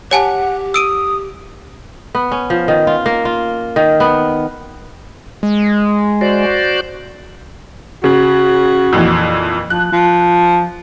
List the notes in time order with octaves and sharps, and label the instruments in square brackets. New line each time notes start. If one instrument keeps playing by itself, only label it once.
[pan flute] G4 [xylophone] C#5 G#5 A5 [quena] F#5
[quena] D#6 [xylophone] E6 D7 D#7
[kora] B3
C#4
F3
D#3
F4
A#3
F4
D#3
B3
[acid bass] G#3
[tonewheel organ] F#4 C5 D5
[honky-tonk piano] C#3 [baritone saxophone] F#4
[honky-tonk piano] F2 A#2 E3
[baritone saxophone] F3 [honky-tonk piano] F#6
[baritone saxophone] F3